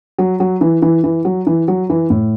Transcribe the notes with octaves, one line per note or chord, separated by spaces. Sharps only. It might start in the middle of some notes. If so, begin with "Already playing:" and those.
F#3
F#3
E3
E3
E3
F#3
E3
F#3
E3
A2